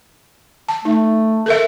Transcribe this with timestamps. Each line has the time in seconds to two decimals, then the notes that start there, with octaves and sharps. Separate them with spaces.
0.69 A5
0.85 A3 D#4
1.46 A4 A#4 E5